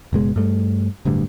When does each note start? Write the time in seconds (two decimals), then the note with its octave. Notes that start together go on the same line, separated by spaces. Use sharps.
0.13 F#1 B2 G#3
0.36 G2 A3
1.05 D1 D2 G2 D3